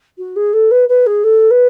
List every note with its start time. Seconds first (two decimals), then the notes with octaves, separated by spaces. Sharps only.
0.18 F#4
0.36 G#4
0.53 A4
0.71 B4
0.89 B4
1.06 G#4
1.24 A4
1.51 B4